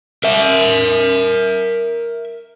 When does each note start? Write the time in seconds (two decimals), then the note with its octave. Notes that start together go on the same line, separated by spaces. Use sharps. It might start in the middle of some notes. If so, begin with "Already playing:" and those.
0.24 A#4 E5